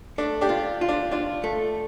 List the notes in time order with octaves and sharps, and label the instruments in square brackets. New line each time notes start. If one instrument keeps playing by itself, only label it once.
[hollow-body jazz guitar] A3 [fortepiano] D4
[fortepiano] D4 G4
[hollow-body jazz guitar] F4
F4
[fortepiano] D4
[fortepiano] D4 [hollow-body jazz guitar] F4
[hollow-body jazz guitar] A3